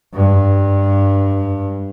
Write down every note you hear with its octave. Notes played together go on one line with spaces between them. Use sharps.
G2